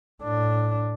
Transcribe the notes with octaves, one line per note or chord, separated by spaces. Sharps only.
A2 D4